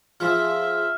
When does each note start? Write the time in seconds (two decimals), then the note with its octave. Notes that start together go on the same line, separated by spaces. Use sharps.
0.20 F3 G#4 E5 F6